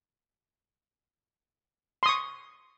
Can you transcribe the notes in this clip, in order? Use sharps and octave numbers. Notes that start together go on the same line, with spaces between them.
C6 C#6 D#6